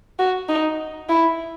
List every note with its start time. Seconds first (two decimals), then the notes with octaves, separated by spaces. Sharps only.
0.19 F#4
0.49 D#4
1.09 E4